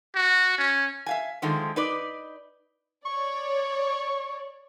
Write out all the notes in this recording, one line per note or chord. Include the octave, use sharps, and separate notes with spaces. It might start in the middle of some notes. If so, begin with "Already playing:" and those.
F#4
C#4
E5 F5 G#5
D3 D#3 F3 G#3 A3
D#4 B4 D5
C#5 D5 C#6